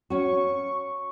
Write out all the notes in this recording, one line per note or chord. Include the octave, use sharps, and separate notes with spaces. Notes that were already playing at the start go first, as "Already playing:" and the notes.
C#4 F#4 C#6